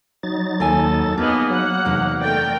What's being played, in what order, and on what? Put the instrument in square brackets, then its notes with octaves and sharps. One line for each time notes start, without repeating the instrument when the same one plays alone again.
[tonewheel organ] F#3 D#4 A6
[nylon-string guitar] D#2 G#5 [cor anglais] A4
[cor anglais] A#3 [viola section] B3 G#4 D#5 [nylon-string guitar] D#4
[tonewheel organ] F#3 [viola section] F#5
[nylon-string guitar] E2 C3 D#4
[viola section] A3 A#4 G5 [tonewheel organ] D5